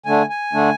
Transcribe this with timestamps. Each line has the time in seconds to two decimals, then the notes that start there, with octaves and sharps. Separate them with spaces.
0.06 D3 A3 D4 G#5
0.30 G#5
0.53 D3 A3 D4